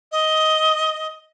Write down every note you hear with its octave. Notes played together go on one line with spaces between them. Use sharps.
D#5